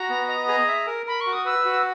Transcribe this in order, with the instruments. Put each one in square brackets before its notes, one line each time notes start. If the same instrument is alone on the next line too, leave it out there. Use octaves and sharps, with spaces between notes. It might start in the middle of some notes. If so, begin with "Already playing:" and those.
Already playing: [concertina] F#4 [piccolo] A#5
[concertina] B3
D#5
G#4
E5
A#4
[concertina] A#4 [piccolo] B5
[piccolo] C#6
[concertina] F#4
[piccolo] D#6
[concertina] B4 [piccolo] E6
[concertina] F#4